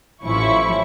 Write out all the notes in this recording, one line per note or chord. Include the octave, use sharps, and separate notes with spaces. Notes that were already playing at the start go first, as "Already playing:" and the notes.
A1 F3 C#4 E4 C#6